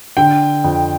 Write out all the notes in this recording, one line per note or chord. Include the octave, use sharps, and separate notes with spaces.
D3 G5
F2